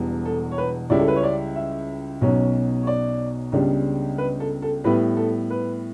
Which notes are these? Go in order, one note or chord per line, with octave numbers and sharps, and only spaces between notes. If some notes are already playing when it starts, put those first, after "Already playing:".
Already playing: E1 E2 B2 G3 B3
A4
C#5
B4
C#2 C#3 G3 C#4 E4 D5
A4
B4
C#5
D5
E5
B1 B2 F#3 C#4
C#5
D5
C#2 C#3 G3 B3 D4
B4
A4
A4
A2 G3 B3 E4 B4
A4
B4